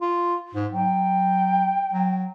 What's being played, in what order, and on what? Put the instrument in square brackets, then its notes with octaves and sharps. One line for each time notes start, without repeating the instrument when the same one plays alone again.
[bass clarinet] F4
G#2
[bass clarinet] F#3 [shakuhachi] G5
[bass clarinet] F#3